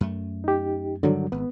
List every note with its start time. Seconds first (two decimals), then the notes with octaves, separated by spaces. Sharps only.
0.01 F#2 A3
0.44 D#4 G4
1.03 G2 D3 D#3 F#3 G3
1.32 G#1 B3